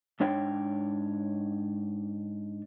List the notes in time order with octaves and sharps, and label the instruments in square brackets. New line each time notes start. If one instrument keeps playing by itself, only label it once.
[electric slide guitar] G#2 D4 C#5 G5